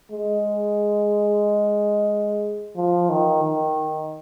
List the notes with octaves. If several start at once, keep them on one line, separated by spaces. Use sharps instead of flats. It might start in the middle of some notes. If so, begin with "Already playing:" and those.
G#3
F3
D#3
D#3